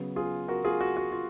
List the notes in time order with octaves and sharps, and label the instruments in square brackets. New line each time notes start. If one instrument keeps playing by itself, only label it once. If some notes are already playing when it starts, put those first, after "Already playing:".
Already playing: [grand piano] C#3 F#3 B3
F4 G#4
F#4 A#4
F4 G#4
F#4
F#4
F4